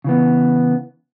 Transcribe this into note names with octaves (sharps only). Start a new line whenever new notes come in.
C#3 E3 B3